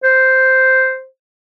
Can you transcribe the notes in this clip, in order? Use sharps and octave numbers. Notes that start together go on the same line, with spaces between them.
C5